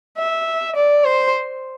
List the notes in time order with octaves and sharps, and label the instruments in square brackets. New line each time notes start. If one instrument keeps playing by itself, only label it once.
[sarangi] E5
D5
C5